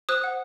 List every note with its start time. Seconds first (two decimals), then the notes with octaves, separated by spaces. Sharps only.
0.09 C5 D#6 F#6
0.24 F#5